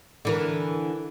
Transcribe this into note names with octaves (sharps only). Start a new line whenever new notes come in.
D3 E3 A#4